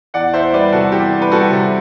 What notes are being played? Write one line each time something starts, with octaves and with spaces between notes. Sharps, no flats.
E2 D5 F#5
E2 C5 E5
G3 B4 D5
C3 F#4 A4
E2 G4
E2
B4
G3 F#4 A4
C3